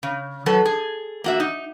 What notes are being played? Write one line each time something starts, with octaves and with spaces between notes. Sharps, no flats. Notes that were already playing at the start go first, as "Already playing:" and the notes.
C#3
F#3 A4 B4
G#4
A#3 F#4 E5
D#4